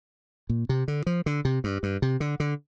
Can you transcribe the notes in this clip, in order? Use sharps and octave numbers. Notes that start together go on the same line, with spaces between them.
A#2
C3
D3
F3
D3
C3
G2
G2
C3
D3
D3